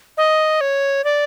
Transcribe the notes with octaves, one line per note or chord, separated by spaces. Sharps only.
D#5
C#5
D5